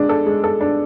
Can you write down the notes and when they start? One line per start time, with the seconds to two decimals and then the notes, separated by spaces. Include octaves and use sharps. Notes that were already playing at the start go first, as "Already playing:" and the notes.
Already playing: G#3 D4
0.09 A4
0.26 G#3
0.44 A4
0.61 D4